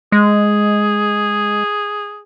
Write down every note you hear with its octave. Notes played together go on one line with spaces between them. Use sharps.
G#3 G#4